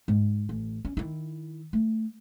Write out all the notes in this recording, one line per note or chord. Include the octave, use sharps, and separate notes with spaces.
G#2
A1
C#4
D#3 E4
A3